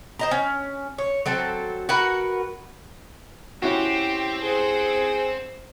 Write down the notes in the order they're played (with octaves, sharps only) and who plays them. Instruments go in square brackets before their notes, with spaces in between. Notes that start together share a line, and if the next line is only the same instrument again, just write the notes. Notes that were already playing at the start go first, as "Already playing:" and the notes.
[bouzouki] C5 D#5 A#5
C#4
C#5
F#3 C4 A4
F#4 A#4 B4 F#5
[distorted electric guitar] C4 [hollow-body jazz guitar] C#4 E4 F#4 [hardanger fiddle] G4
[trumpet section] G#4 [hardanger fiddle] C5 F#5